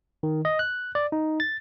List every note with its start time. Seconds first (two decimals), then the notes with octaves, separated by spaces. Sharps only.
0.23 D#3
0.45 D#5
0.59 F#6
0.95 D5
1.12 D#4
1.40 A6